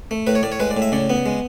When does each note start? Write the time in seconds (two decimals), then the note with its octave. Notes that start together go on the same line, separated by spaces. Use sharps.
0.11 A3
0.27 A2 B4
0.35 C#5
0.43 A2 D5
0.52 C#5
0.60 G#3 B4
0.71 D5
0.77 A2
0.82 E5
0.92 C#3 D5
1.10 B3
1.26 G#3